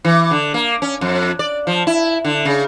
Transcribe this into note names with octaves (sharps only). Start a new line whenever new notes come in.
E3
D3
A#3
C#4
F2
D5
F3
E4
D3
C#3